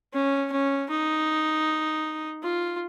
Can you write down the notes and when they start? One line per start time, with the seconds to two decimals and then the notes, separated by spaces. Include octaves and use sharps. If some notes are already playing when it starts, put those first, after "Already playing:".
0.13 C#4
0.51 C#4
0.90 D#4
2.43 F4